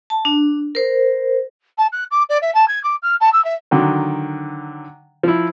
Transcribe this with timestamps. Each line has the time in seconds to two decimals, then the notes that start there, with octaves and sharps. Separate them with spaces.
0.10 A5
0.25 D4
0.75 A#4 C5
1.78 A5
1.92 F#6
2.11 D6
2.29 D5
2.42 E5
2.54 A5
2.68 G#6
2.84 D6
3.03 F6
3.21 A5
3.33 E6
3.45 E5
3.71 D3 D#3 F#3
5.23 F3 E4